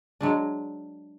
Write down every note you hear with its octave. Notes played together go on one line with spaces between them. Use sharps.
F#3 G#3 D4